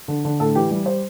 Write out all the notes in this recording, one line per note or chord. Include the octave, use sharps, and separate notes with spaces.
D3
D3
A2 A4
E3 G4
G3
C5